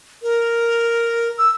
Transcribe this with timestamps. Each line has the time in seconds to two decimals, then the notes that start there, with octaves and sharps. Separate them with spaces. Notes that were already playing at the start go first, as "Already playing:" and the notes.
0.23 A#4
1.38 E6